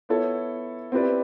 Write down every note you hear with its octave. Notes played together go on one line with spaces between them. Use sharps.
B3 E4 A4 C#5
C4 E4 G4 B4 D5